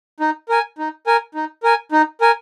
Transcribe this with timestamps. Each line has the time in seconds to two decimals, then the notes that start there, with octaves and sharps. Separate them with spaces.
0.20 D#4
0.49 A#4 G#5
0.78 D#4
1.07 A#4 G#5
1.35 D#4
1.63 A#4 G#5
1.92 D#4
2.21 A#4 G#5